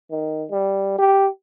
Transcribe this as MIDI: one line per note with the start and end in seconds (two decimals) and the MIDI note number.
0.11 0.45 51
0.51 0.96 55
0.99 1.28 67